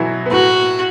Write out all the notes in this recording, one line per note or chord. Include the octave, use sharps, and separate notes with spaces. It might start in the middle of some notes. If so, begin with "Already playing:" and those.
Already playing: B2 E3 F#3 E4 F#4 A4
B3
A2 A3 F#4